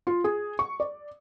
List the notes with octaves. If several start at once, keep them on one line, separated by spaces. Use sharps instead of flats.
F4
G#4
C#6
D5